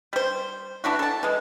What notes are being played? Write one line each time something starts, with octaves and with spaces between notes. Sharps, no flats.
G3 C5
E3 D4 E4 F#4
A4 A5
E3 G#3